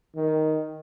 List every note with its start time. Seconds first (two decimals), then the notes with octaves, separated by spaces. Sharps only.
0.16 D#3